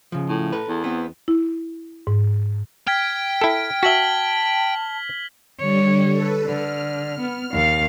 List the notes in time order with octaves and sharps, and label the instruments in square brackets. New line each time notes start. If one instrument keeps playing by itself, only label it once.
[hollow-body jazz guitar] C#3 F3
[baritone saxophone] A2
[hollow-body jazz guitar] A4 B4
[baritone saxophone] E2
[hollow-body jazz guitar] B3 C4
[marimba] E4
G#2
[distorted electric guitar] G5 [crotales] F6 G#6 B6
[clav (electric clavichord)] E4 A4
[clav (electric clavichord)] F#4 E5 [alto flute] A5 [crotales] B6 F#7 G7
[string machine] D3 G3 [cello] C#5
[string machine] A4 B4
[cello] D3 [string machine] F6
[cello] B3
D#2 F5